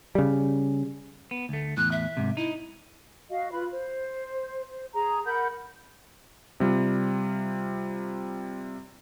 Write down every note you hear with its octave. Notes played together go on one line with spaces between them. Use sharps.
C#3 G3
B3
D2 A3
E2 A2 F#6
E5
G#2 C3
D#4 E4
F#4 D#5 F5
F4 B4 B5
C5
C5
G#4 A#5
A#4 F#5 B5 G6
C3 G3 F4